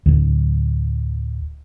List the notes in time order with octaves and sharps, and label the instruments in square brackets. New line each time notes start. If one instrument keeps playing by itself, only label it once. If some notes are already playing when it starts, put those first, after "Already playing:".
[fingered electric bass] D1 D2